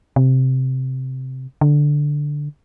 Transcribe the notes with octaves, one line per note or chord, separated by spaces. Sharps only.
C3
D3